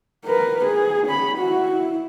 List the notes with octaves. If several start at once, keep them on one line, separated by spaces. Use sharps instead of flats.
A#4 B4
G#4
C#4 B5
E4 F#4
E4